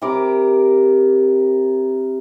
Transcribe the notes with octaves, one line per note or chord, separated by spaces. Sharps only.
C3 A#4 B5 D6